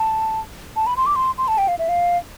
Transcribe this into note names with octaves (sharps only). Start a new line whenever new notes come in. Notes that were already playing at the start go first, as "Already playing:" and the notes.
Already playing: A5
A5
B5
C6
D6
C6
C6
A5
G5
F5
E5
F5